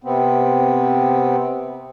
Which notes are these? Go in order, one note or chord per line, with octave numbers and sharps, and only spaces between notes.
C3 B3 C4